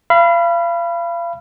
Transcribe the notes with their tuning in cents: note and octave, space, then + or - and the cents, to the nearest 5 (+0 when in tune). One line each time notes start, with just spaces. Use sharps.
F5 -35 B5 +0